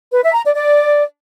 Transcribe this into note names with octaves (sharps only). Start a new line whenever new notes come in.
B4
E5
A#5
D5
D5